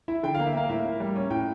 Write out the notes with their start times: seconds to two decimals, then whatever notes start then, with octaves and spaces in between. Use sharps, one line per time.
0.08 E4 E5
0.23 D3 G5
0.35 A#3 F5
0.46 E5
0.55 A#3 F5
0.69 A2 E5
0.85 A#3
1.00 G3
1.16 C#4
1.30 A2 G5